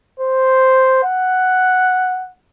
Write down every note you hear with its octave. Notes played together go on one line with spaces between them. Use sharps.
C5
F#5